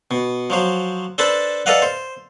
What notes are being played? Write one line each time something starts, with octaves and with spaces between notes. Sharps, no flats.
B2
F3 F#3 C5
D4 A4 B4 C5 A5 B5
A4 B4 D5 D#5 F5 F#5
C5